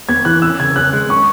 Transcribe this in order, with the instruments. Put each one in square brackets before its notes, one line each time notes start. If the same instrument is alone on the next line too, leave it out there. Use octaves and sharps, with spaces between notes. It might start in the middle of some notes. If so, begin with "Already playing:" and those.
[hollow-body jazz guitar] B3 [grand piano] G#6
[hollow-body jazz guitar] E3 [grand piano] F#6
[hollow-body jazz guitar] C#4 [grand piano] E6
[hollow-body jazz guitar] C#3 [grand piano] G#6
[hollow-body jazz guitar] C#4 [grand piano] F#6
[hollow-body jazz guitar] G#3
[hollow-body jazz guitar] C#4 [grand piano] C#6